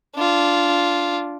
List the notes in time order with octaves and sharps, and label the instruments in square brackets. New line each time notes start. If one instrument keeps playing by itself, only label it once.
[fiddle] D4 F4